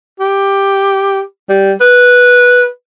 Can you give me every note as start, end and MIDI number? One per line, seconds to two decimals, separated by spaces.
0.20 1.21 67
1.49 1.72 55
1.81 2.65 71